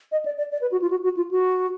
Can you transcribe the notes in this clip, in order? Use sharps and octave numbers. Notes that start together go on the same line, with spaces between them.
D#5
D5
D5
D5
B4
F#4
F4
F#4
F#4
F4
F#4